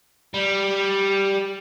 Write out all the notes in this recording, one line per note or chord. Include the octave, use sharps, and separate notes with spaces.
G3